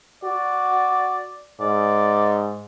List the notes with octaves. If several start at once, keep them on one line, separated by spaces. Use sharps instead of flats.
F#4 D5
G#2 D5